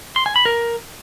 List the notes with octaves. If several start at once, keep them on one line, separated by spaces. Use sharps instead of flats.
C6
G#5
B5
A#4